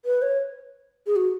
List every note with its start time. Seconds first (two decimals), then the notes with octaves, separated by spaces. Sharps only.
0.05 B4
0.22 C#5
1.07 G#4
1.16 F#4